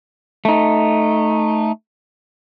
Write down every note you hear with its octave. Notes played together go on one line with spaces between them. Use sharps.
A3 D#4